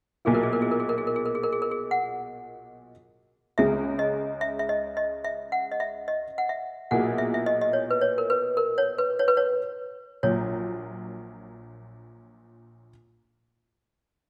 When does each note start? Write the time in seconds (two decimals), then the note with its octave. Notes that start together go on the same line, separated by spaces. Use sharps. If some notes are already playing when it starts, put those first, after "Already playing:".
0.25 B1 A#2 A#3 E4 G#4
0.34 A#4
0.43 G#4
0.53 A#4
0.62 G#4
0.71 A#4
0.80 G#4
0.89 A#4
0.98 G#4
1.07 A#4
1.16 G#4
1.26 A#4
1.35 G#4
1.43 A#4
1.52 G#4
1.62 A#4
1.71 G#4
1.91 F#5
3.58 C#2 C#3 G#3 C#4 E5
3.99 D#5
4.41 E5
4.59 E5
4.69 D#5
4.97 D#5
5.24 E5
5.52 F#5
5.72 D#5
5.80 E5
6.08 D#5
6.38 F#5
6.49 E5
6.91 B1 A#2 A#3 E4 G#4 F#5
7.18 E5
7.34 E5
7.46 D#5
7.61 D#5
7.73 C#5
7.90 B4
8.01 C#5
8.18 A#4
8.30 B4
8.57 A#4
8.78 C#5
8.98 B4
9.19 C#5
9.28 B4
9.37 C#5
10.23 A#1 A#2 F#3 C#5